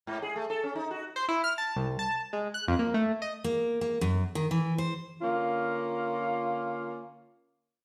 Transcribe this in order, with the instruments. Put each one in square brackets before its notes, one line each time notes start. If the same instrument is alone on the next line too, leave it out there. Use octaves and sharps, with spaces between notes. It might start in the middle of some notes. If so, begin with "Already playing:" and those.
[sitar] G#2
G#4
A3
A4
C#4
D#4
F#4
[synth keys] C5
E4
F6
A5
C2
A5
G#3
F#6
F2
A#3
A3
D#5
[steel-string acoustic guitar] A#3
A#3
F#2
D#3
E3
C5
[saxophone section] D3 A#3 C#4 F4